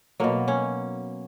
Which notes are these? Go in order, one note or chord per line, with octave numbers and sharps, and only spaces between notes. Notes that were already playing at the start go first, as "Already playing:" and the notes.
B2 F#3 A#3
C#4